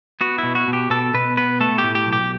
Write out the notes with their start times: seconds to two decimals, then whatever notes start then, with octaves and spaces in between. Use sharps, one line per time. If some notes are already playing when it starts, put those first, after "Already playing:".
0.21 B3 F#4
0.38 E4
0.43 B2
0.55 F#4
0.68 B2
0.73 G4
0.90 B2 A4
1.14 B2 B4
1.37 B3 B4
1.60 A3 A4
1.78 G4
1.84 A2
1.95 G4
2.07 B1
2.13 G4